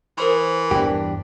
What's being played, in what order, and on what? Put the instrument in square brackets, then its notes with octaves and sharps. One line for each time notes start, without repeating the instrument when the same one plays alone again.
[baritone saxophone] E3 [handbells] A#4 C5 C6
[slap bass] E2 G2 [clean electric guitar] D4 G4